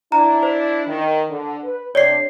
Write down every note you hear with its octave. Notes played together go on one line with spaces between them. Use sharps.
D4 E4 A#5
C5
D#3
D3
B4
C3 D4 C#5 D5 C7